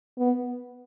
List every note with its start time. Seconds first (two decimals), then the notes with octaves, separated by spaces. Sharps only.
0.19 B3